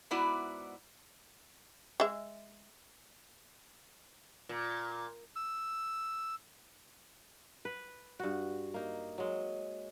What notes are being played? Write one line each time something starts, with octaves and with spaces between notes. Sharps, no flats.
G#2 B3 E4 F#4 D5
G#3 E5
A#2
E6
B4
G2 F#4
A#3 D#4
F#3 G#3